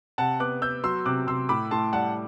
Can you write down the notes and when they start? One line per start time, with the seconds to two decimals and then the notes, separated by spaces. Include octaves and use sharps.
0.18 C3 F#5 A5
0.40 B3 D6 F#6
0.62 B3 E6 G6
0.84 F#3 C6 E6
1.06 C3 D6 F#6
1.27 C3 C6 E6
1.49 A2 B5 D6
1.71 A2 A5 C6
1.93 G3 F#5 A5